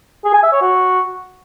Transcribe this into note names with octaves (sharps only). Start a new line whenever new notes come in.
G#4
G#5
E5
C#5
F#4